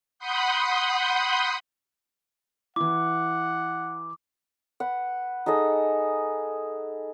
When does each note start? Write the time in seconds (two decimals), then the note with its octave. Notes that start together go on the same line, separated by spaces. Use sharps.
0.19 F#5 B5 C6 D#6 G6
2.76 E3 E4 F#5 D6
4.80 B4 F#5
5.46 D#4 G#4 A4 D#5